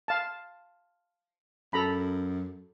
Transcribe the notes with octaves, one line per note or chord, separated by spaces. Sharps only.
F5 A5
F#2 A4 A#5 B5